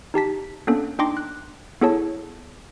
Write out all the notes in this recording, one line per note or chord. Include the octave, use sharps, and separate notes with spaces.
D#4 G4 A5 B6
A#3 B3 C#4 D4 A4
D4 D#4 G5 C6 D6 A#6
F#6
B3 E4 G#4 A4 C#5 A5